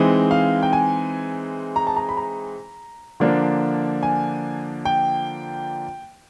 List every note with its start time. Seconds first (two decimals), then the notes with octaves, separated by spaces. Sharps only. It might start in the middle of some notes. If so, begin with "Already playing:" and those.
Already playing: E3 G#3 C4 D#4
0.31 F5
0.63 G5
0.73 G#5
1.76 A#5
1.87 A5
1.96 A#5
2.09 B5
2.17 A#5
3.20 D3 F3 A#3 D4
4.03 G#5
4.85 G5